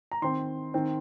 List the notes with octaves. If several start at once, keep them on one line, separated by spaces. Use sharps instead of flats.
A#5
D#3 C4 C6
D#3 C4